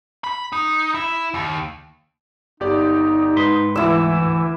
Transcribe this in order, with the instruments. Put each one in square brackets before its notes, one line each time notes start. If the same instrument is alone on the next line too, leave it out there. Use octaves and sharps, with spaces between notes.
[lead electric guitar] B5
D#4
E4
D#2
[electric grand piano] G1 G4 D5 [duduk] D#4
[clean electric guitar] G#2 B4 C6
[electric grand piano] D2 D6 [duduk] E3 [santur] E4 E6